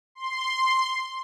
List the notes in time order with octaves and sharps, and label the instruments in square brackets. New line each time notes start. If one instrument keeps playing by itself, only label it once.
[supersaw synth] C6